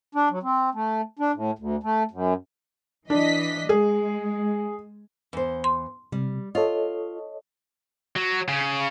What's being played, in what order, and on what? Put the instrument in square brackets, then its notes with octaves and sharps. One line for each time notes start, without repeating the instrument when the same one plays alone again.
[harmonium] D4
F#3
C4
A3
D4
A2
D2
A3
F#2
[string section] E3 D#5 B6 [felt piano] D4
[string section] G#3 [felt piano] G#4
[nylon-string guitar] E2 C5
[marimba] C6
[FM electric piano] C3 [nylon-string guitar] G3
[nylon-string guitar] F4 [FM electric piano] A4 C#5 D#5
[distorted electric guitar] F#3
C#3